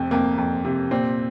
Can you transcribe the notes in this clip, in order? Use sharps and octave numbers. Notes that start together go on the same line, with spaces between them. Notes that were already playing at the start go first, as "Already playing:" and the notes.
Already playing: F1 F2 C4
F2 A#3
F2
C3
A#2 C4